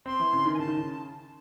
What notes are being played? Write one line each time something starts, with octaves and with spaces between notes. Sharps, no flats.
C4 C6
E3
C#3
D#3
G#5
C#3 A5
D#3
C#3